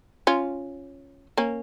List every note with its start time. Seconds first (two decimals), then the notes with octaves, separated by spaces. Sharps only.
0.27 C#4 F4
1.37 A#3 C#4